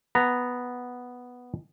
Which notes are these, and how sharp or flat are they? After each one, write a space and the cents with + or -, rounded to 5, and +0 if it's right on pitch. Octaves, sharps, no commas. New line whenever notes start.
B3 +0 A#5 -10